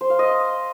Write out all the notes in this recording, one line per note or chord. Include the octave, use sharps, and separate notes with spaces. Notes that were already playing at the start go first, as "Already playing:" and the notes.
C5
F5
D#5